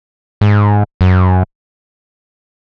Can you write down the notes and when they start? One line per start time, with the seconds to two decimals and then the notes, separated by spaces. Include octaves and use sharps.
0.41 G#2
1.01 F#2